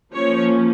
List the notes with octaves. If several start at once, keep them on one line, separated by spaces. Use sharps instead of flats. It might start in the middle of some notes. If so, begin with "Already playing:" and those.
F3 A#3 C#4 C#5